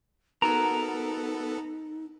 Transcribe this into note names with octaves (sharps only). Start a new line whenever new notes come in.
B3 D#4 F#4 A4 A#4 A#5